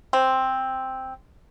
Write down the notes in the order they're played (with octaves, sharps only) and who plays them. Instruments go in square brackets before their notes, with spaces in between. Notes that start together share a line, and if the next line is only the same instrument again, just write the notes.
[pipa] C4